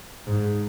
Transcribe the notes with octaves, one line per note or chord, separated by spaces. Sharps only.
G#2